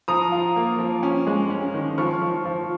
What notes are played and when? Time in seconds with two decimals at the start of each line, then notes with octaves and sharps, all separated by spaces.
0.08 F3 A#5 D#6
0.32 F4
0.56 A#3
0.79 F3
1.03 C#4
1.27 G#3
1.50 C#4
1.74 D#3
1.98 F3 C#6 F6
2.21 F3
2.45 F3